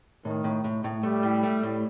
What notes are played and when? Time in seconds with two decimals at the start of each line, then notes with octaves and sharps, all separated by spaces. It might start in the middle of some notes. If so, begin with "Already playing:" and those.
0.25 A2 D#3
0.44 A2
0.64 A2
0.84 A2
1.03 G3 A3
1.23 A2
1.43 A3
1.63 A2